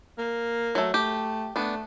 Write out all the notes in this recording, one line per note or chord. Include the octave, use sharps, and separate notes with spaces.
A#3
F#3 A3
A3 G4
A3 B3 D4